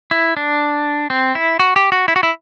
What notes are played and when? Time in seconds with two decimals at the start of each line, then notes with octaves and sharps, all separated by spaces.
0.11 E4
0.37 D4
1.10 C4
1.35 E4
1.59 F#4
1.76 G4
1.92 F#4
2.08 E4
2.16 F#4
2.23 E4